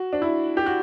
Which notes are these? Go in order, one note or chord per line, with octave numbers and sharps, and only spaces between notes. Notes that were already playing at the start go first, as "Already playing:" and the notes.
Already playing: F#4
D4
E4
G4
F#4